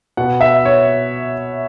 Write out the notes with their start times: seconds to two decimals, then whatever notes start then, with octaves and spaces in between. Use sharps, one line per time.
0.17 B2 B3 F#5
0.41 E5
0.65 C#5